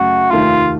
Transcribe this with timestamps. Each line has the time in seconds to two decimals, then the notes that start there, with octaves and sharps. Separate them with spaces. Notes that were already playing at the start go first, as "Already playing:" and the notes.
Already playing: F#2 C#3 F#3 A3 F#4
0.31 F1 D#2 D#3 A3 F4